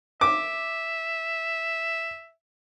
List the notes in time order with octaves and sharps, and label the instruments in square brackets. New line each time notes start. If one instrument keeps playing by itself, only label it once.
[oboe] E5 [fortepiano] D6